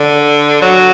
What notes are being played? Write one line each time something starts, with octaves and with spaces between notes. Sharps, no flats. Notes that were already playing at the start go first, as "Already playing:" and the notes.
Already playing: D3
F#3